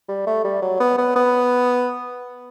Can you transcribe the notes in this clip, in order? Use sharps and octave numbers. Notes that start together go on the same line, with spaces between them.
G3
A3
G3
F#3
B3
B3
B3